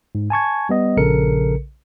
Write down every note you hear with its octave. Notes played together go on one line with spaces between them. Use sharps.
G#2
G#5 A5 C#6 G#6
G3 B3 D#5
A#1 C#3 A4 A#4 C#7